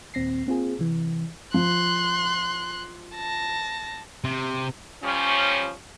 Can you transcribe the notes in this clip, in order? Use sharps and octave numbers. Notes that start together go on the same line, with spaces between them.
D#2 A#2 C4 A#6 C7
A#3 C4 F4 G#4
C3 E3
F3 C6 F#6
A5 A#6
C3
F3 G3 C#4